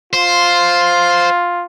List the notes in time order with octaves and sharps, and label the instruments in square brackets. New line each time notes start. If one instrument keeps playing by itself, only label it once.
[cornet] F4 [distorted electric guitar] C5